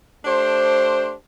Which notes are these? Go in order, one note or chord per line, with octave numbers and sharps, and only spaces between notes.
A3 D4 G4 C5